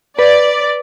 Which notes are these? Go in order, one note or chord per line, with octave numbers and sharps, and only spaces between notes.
B4 D5